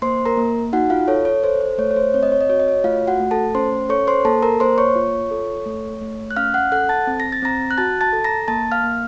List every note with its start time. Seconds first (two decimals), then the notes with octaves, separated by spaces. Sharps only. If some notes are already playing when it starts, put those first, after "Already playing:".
0.02 A#3 C5 C6
0.25 A#4 A#5
0.37 A#3
0.73 D#4 F#4 F#5
0.90 F4 F5
1.08 A4 C#5
1.25 C#5
1.43 A4 C5
1.61 C5
1.78 A3 C#5
1.91 C#5
1.96 C5
2.14 C4 C#5
2.23 D#5
2.32 C#5
2.41 D#5
2.49 F#4 C#5
2.60 D#5
2.68 C#5
2.84 A3 F4 F5
3.07 F#4 F#5
3.20 A3
3.31 A4 A5
3.54 C#4 C5 C6
3.89 A4 C#5 C#6
4.07 C5 C6
4.25 A#3 A4 A5
4.43 A#4 A#5
4.60 A#3 C5 C6
4.78 C#5 C#6
4.95 F4
5.31 A4
5.66 A3
6.01 A3
6.31 F#6
6.36 C#4 F5 F6
6.54 F#5 F#6
6.72 A4 F#5 F#6
6.89 A5 A6
7.07 C4
7.20 A#6
7.32 A6
7.42 C4 A#5 A#6
7.71 F#6
7.78 F#4 A5 A6
8.01 A5 A6
8.13 A4
8.24 A#5 A#6
8.48 A#3 A5 A6
8.72 F5 F6
8.83 A#3